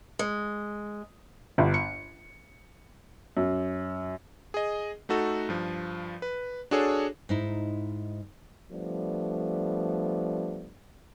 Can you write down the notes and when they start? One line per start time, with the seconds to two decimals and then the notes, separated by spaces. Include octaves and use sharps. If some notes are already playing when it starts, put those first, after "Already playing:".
0.19 G#3
1.58 G1
1.74 C#7
3.37 F#2
4.54 G#4 D#5
5.09 A3 D#4 F#4 A4
5.49 G2 F3
6.22 B4
6.71 D4 F#4 G#4 A4 C#5
7.29 G#2 D#4 E4
8.71 F3 G3 A3 B3 D4